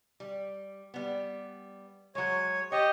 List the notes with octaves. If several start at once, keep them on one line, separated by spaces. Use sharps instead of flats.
G3
G3 B3
F#3 G#3 C#5
G4 C#5 D#5